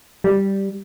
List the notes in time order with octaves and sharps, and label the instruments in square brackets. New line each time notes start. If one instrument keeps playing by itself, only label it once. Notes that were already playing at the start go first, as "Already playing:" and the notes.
[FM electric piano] G3